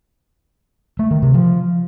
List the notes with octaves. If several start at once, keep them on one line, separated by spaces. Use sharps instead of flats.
A3
D#3
C3
F3